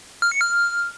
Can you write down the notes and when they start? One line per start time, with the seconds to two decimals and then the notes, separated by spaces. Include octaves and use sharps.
0.22 F6
0.32 C#7
0.41 F6